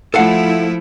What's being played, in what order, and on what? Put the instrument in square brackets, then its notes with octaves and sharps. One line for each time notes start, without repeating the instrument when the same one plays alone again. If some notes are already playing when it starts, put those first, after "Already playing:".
[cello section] F3 A3 E4 [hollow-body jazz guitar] A4 F5 F#5